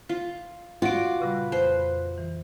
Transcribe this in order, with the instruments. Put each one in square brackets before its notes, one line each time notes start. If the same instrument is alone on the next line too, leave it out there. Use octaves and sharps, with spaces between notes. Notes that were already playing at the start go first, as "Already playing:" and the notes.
[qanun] F4
[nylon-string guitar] F4 [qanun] F#4 D6 [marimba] D5 C#6
[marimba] A#2 C#3 G3 [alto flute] B4
[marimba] F2 [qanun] C5
[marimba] E3